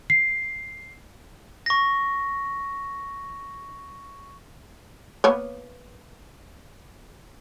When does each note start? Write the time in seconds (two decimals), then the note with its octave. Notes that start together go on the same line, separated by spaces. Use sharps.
0.10 C7
1.66 C#6 A#6
5.24 A#3 B3 C#5